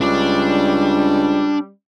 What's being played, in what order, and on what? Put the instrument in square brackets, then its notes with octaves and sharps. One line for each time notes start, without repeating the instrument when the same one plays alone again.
[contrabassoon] C#2 [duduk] G3 [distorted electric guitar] D4 D5